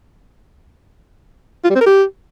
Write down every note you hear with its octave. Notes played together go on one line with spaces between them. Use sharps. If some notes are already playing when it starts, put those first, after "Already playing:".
F4
G3
C4
A#4
G4